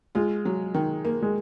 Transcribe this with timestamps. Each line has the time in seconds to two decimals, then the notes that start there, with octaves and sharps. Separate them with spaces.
0.15 G#3 F4
0.45 F#3
0.74 D#3
1.05 A#3
1.22 G#3